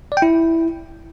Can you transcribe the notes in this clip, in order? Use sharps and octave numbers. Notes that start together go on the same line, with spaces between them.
D5
G5
E4